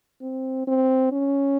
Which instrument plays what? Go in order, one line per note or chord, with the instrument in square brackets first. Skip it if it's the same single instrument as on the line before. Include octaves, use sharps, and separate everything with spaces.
[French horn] C4
C4
C#4